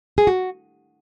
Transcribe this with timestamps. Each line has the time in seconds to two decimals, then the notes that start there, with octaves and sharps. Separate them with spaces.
0.18 G#4
0.27 F#4